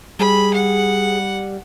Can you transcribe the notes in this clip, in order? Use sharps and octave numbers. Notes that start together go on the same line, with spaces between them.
G3 G#4 B5
F#5